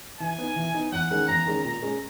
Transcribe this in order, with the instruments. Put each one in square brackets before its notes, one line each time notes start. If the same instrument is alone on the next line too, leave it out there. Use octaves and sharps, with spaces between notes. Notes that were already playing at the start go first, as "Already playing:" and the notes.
[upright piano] E3 [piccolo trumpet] G#5
[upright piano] B3 D#4
E3
B3 D#4
[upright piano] E2 [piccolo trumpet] F#5
[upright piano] D#3 G#3 C#4
[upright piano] E2 [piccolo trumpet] A#5
[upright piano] D#3 G#3 C#4
[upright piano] A#2 [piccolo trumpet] A#5
[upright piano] G#3 C#4 G#4